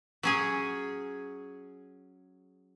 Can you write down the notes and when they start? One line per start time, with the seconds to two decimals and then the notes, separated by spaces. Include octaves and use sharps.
0.23 F#3 C#4 G#4